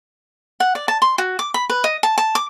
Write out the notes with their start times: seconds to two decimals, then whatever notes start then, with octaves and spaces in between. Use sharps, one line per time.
0.60 F#5
0.75 D5
0.88 A5
1.02 C6
1.18 F#4
1.39 D6
1.54 B5
1.70 B4
1.84 D#5
2.03 A5
2.18 A5
2.35 D6